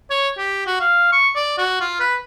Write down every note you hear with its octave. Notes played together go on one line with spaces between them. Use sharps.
C#5
G4
F#4
F5
C#6
D5
F#4
F4
B4